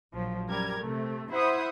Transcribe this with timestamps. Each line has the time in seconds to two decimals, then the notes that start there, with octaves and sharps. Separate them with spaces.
0.14 A#1 F3 F#3
0.48 F#2 G3 A#4 G#6
0.80 C3 A3
1.32 E4 C5 E5 F#5 D#6